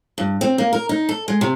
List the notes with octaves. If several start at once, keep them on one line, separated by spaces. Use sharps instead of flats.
G2
C4
A#3
A#4
D#4
A4
G#3
C3